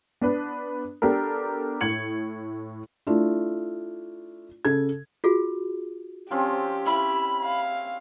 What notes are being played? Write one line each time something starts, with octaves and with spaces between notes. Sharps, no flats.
B3 D4 B4
B3 D4 G4 A4 A#4
A2 G#6 C#7 F#7
A3 D4 E4 F4
C#3 A4 G#6
F4 F#4 G#4
F3 C4 C#4 G4
E4 E5 B5
F5